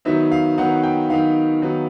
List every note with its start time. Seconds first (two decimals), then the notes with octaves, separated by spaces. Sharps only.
0.05 D#3 F#3 B3 D#4 E5
0.32 F5
0.58 D#3 F#3 B3 D#4 F#5
0.83 G5
1.10 D#3 F#3 B3 D#4 F5
1.62 D#3 F#3 B3 D#4